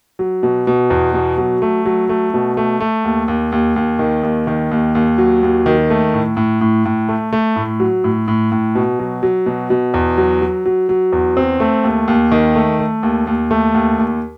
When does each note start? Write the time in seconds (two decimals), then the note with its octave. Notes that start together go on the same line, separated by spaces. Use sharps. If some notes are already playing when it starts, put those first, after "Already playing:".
0.19 F#3
0.43 B2
0.67 B2
0.90 E2
1.14 B2
1.38 F#3
1.62 A3
1.86 F#3
2.09 A3
2.34 B2
2.57 A3
2.80 A3
3.05 D#2
3.28 D#2
3.52 D#2
3.76 D#2
3.99 D#3
4.23 D#2
4.47 D#3
4.71 D#2
4.95 D#2
5.18 F#3
5.43 D#2
5.66 D#3
5.90 A3
6.14 A2
6.37 A2
6.61 A2
6.85 A2
7.09 A3
7.32 A3
7.56 A2
7.80 F#3
8.04 A2
8.28 A2
8.52 A2
8.75 B2
8.99 F#3
9.23 F#3
9.46 B2
9.70 B2
9.94 E2
10.18 F#3
10.41 F#3
10.65 F#3
10.89 F#3
11.13 E2
11.37 C4
11.60 A3
11.84 D#2
12.08 D#2
12.32 D#3
12.55 A3
12.79 A3
13.03 D#2
13.27 D#2
13.51 A3
13.74 D#2
13.98 D#2